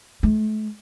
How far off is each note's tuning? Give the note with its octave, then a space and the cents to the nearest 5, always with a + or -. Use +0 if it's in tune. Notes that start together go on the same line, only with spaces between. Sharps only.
A3 -35